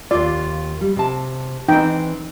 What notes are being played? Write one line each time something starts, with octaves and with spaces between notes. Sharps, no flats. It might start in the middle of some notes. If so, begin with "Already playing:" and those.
D#2 F4 D5
G3
C3 A5
E3 C4 D#4 G5